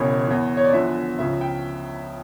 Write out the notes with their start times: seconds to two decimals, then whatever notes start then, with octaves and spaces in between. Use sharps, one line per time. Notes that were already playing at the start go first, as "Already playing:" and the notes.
Already playing: E1 E2 C#3 E3 C#5
0.27 E2 E3
0.57 C#5
0.64 D5
0.73 E2 D3 F3 E5
1.19 C#2 C#3 F3 E5
1.41 G5